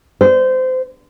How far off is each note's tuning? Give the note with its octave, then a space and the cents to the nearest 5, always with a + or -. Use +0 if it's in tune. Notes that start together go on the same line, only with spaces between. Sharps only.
C5 -25